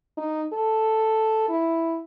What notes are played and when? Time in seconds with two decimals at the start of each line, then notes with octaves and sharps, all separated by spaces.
0.17 D#4
0.53 A4
1.49 E4